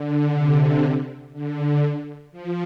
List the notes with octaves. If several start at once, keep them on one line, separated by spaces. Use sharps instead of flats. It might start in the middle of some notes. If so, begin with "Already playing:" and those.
Already playing: D3
C3
D3
F3